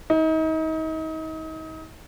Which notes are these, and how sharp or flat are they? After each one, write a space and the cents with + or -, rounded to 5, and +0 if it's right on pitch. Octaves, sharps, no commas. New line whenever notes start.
D#4 +35